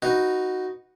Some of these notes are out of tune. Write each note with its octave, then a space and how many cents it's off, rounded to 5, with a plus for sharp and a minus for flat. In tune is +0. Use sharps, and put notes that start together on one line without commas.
D#4 +0 F#4 +0 B4 +0